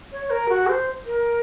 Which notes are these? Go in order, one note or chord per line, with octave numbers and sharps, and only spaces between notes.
C#5
A#4
F#4
C5
A#4